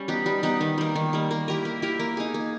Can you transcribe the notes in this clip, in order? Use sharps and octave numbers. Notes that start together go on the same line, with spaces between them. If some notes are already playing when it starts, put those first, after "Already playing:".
Already playing: G3 C#4
B3 D#4 G4
G3
B3 D#4 G4
D#3
G3 A#3
D#3
G3 A#3
A#3
E4 G4 A#4
A#3
E4 G4 A#4
A#3
D#4 G#4
A#3